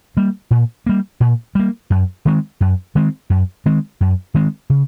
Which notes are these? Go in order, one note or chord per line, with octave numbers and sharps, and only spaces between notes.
G3 A#3
A#2
G3 A#3
A#2
G3 A#3
F#2
D#3 G#3 C4
F#2
D#3 G#3 C4
F#2
D#3 G#3 C4
F#2
D#3 G#3 C4
C#3